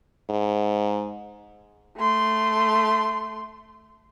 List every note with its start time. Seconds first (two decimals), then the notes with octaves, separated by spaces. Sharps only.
0.30 G#2
1.98 A3 C6